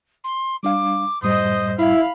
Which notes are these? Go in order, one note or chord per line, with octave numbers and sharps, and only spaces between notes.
C6
G3 D4 F5 D6
F#2 A2 G3 C5 D#5 D#6
E4 F5 B5